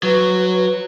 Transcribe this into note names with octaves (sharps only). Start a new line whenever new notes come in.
F#3 B4